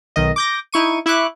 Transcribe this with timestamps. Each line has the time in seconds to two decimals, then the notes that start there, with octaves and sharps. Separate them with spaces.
0.16 B1 D#3 D#5
0.36 D6 G6 A#6
0.73 D#4 E4 C#6 D#7
1.06 E4 E5 C#6 D6 F#6